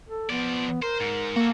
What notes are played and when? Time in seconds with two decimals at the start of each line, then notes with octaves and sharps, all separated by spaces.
0.09 A4
0.30 F3 B3 D5
0.82 A#4 C5
1.00 G#2
1.36 A#3 F#4 A4